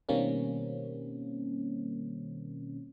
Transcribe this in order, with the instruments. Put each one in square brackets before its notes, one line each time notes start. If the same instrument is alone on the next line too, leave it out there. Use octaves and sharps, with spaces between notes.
[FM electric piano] B2 D#3 G3 A#3 C4 C#4